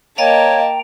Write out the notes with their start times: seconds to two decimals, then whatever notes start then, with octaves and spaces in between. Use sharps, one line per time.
0.18 A#3 C#5 D#5 F5 G5 A5 A#5